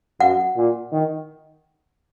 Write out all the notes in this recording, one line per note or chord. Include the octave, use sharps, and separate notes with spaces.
F#2 F#5
A#2
D#3